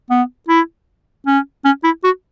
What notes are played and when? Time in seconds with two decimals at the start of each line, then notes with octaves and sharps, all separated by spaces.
0.10 B3
0.49 E4
1.27 C#4
1.65 C#4
1.84 E4
2.04 F#4